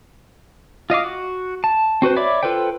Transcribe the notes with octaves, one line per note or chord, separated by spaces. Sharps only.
F4 D#5 F5 D6
F#4
A5
C4 F#4 B4 C5
C#5 D5 E5 B5 D6
F4 A4 B4 C5 G5